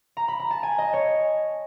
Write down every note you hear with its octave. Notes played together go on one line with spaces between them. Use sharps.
A#5
B5
A#5
A5
G#5
D#5
C#5